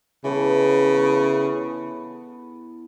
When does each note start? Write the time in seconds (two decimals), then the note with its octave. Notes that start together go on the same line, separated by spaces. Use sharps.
0.24 C#3 E3 B3 E4 A4
0.93 E3 B3 E4 A4